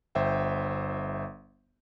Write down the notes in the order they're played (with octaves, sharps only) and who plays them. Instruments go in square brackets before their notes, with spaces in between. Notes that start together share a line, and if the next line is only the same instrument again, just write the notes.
[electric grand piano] G1 C5 E5 G5